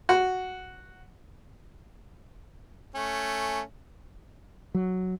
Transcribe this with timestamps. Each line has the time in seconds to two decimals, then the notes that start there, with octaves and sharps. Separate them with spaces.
0.09 F#4
2.95 A3 C#4
4.75 F#3